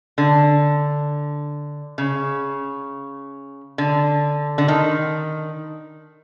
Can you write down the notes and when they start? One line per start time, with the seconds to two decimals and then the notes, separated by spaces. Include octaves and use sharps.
0.18 D3
1.98 C#3
3.78 D3
4.58 D3
4.68 D#3